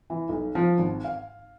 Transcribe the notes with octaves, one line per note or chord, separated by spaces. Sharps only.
E3
B1
F3
G#1
F5